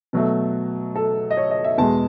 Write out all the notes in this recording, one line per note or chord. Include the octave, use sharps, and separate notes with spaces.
B2 F#3 A3
A4
D#5
C#5
D#5
E5
E2 B2 G#3 A5